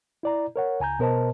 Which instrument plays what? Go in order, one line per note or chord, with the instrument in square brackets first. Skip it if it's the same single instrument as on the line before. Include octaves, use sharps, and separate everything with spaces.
[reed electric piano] E4 D5 A#5
A#4 C#5 F#5
C#2 G#5 A#5 G6
B2 B3 A#4 C5 D#5 A5